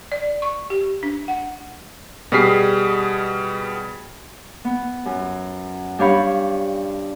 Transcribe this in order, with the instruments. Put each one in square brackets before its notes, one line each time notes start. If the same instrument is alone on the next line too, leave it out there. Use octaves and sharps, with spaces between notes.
[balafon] D5
C#6
G4
D4
F#5
[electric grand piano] B2 G3 G#4 F6 B6 C7
[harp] B3
F#2
G2 D4 G4 C#5 F5 B5